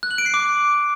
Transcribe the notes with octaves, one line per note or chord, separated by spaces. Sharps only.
F#6
F#7
D7
C7
D6